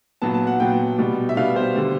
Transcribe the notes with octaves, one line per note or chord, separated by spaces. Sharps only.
A#2 F#3 B3 A5
A5
F#5
A#2 F#3 B3 G5
B2 G3 B3
E5
B2 G3 B3 F5
C5
D3 G3